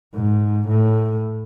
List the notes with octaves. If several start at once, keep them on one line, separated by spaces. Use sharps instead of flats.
G#2
A2